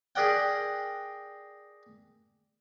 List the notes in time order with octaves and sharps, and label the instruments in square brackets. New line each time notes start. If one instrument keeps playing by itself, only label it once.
[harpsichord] G4 G#4 A#4 D5 F#5 G5